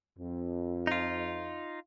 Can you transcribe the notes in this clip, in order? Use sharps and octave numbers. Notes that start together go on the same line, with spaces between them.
F2
D#4 F4